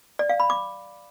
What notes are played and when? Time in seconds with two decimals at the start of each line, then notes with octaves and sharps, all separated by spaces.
0.19 D5
0.29 F5
0.40 B5
0.50 D6